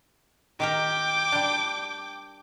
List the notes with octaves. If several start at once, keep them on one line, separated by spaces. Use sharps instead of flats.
D#3 G4 A#4 G5 D6
G3 D4